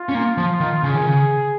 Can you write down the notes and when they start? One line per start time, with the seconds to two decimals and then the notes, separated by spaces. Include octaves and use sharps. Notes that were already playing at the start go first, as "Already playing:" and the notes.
Already playing: F4
0.09 C#4
0.15 A#3
0.37 F3
0.60 D#3
0.83 C#3 G#4
0.95 D#3
1.07 C#3